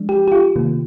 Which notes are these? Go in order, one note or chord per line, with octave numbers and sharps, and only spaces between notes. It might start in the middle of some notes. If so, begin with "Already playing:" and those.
Already playing: F3 G#3 D4
G4
G4
F4
C3 D#3 A#3